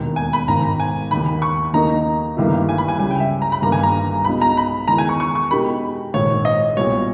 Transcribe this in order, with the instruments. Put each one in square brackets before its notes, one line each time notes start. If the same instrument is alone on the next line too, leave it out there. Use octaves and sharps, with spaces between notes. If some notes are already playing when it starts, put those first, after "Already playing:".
Already playing: [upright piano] E1 D#2 D#3
[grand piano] G#5
B5
[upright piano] G#1 G#2 D#3 [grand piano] A#5
[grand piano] G#5
[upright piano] D#2 D#3 A#3 [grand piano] B5
[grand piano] C#6
[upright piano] D#2 D#3 A#3 D#4 [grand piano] A#5
[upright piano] G1 G2 D#3 A#3 E4
[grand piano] G#5
B5
G#5
[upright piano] C#2 C#3 G3 [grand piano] G#5
[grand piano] G5
E5
A#5
B5
[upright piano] G1 G2 D#3 A#3 [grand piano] A#5
[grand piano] G#5
A#5
[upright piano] B1 B2 G#3 D#4 [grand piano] B5
[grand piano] A#5
B5
[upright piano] E2 D#3 G#3 [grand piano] A#5
[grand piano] G#5
C#6
C#6
C#6
[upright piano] B2 G#3 D#4 G4 A#4 [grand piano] B5
[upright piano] A#1 G#2 D#3 [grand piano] C#5
[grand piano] D#5
[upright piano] B1 A#2 G3 [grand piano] C#5